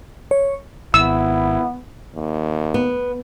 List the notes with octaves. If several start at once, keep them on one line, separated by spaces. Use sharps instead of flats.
C#5
G#1 B3 E4 E6
D#2
B3